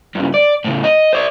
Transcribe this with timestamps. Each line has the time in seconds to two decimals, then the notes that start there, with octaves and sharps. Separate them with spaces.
0.15 G2 C#3
0.34 D5
0.65 A2 C#3
0.84 D#5
1.13 C5 D5